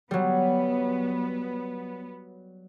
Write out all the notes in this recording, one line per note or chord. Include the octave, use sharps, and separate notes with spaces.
F#3 G3 B3